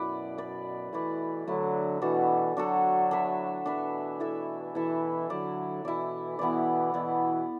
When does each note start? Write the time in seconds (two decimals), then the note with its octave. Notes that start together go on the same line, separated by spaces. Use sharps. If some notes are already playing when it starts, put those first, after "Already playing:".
Already playing: F#2 B2 E4 B4 D5
0.38 E4 B4 D5
0.92 B2 E3 A3 E4 B4 D5
1.47 D3 F#3 A3 E4 B4 D5
2.02 B2 E3 D4 F#4 A4
2.56 D3 F#3 D4 F#4 A4
3.11 D4 B4 E5
3.65 B2 E3 D4 B4 E5
4.20 E4 A4 E5
4.75 B2 E3 E4 A4 E5
5.30 D3 F#3 E4 D5
5.84 B2 E3 E4 D5
6.39 B2 E3 B3 E4 D5
6.93 B2 E3 B3 E4 D5